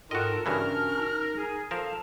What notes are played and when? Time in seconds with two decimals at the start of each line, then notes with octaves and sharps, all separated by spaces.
0.11 G#2 F4 F#4 A4 A#4 D#5 G5
0.46 G2 C#3 E3 C#4 D4 F#4 A#4 F6
0.98 D#4
1.35 G#4
1.71 F3 A4 A#4 F5 A5